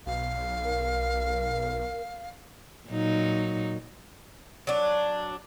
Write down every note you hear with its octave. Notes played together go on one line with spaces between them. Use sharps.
B1 F5
A#4
A#2 F#3 D#4
F#3 D4